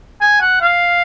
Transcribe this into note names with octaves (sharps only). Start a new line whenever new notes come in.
G#5
F#5
F5